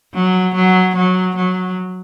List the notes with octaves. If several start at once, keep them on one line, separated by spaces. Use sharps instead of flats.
F#3
F#3
F#3
F#3